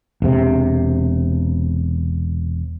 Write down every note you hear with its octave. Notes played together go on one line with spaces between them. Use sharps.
E1 C3